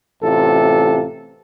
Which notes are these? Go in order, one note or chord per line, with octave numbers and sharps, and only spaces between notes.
A1 C3 F4 A4